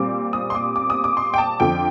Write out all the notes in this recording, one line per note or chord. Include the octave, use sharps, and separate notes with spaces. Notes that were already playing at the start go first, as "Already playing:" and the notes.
Already playing: A#2 G3 C4 D6
D#6
C6
D6
D6
D#6
D6
C6
G5
A5
F2 D3 F3 G5